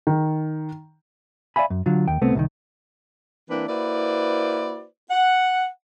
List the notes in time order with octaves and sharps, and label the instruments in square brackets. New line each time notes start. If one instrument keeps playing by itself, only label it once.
[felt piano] D#3
[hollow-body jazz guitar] D5 E5 F5 G#5 B5
F#2
D3 F#3 F4
D#2 G5
C2 A3 B3 C4
C2 B2 D#3
[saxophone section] E3 A#3 C4 D4 E4 B4
A#3 E4 F#4 B4 C5 D5
F#5